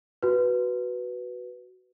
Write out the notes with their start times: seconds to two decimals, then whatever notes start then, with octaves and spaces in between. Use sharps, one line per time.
0.23 F#4 B4